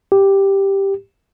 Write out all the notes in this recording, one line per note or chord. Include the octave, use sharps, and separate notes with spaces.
G4